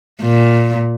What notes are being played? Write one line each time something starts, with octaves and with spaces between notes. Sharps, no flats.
A#2